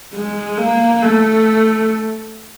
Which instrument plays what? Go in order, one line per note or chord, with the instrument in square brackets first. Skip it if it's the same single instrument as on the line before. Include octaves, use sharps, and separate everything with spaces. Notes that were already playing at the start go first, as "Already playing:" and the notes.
[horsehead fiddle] G#3
A#3
A3